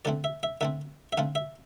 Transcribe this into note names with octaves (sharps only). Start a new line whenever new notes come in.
D3 A3 C4 D5
E5
E5
D3 A3 C4 E5
E5
D3 A3 C4 F5
E5